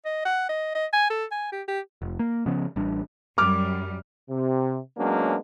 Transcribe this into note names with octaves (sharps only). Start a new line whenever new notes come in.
D#5
F#5
D#5
D#5
G#5
A4
G#5
G4
G4
F1
A#3
C#3 F3 B3 C#4
A1 G3 D4
F#2 G3 D6 F6
C3
F#3 G#3 A#3 B3 C#4 D4